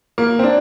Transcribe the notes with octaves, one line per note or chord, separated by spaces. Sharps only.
A#3
C4
D4